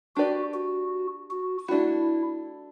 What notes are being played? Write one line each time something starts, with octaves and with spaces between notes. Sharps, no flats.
D4 F#4 G4 B4 D5
F#4
F#4
A3 D4 E4 F#4